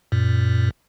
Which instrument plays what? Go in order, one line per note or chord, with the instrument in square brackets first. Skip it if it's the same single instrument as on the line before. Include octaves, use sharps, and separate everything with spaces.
[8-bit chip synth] F#2 A#2